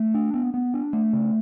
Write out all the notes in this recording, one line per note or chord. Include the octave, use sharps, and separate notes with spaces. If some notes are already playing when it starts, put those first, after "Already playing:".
Already playing: A3
D4
B3
B3
D4
A3
C#3